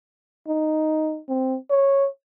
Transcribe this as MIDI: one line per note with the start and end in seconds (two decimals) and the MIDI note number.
0.48 1.20 63
1.29 1.57 60
1.70 2.07 73